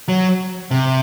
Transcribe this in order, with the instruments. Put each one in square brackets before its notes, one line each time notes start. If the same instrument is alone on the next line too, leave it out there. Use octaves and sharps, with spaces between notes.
[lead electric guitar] F#3
C3